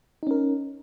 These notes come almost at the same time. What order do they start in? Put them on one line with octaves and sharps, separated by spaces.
D#4 C#4 A#4